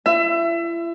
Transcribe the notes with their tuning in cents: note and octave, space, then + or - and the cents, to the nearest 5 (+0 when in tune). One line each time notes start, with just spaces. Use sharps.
E4 +45 E5 +25